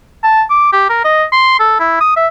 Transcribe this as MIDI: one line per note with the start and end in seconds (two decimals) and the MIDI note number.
0.23 0.43 81
0.50 0.72 86
0.73 0.86 67
0.89 0.99 70
1.05 1.24 75
1.33 1.57 84
1.59 1.78 69
1.80 1.97 64
2.00 2.11 87
2.16 2.27 76